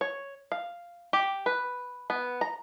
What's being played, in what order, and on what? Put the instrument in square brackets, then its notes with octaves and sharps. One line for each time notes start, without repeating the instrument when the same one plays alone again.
[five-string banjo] C#5
F5
G4
B4
B3
A#5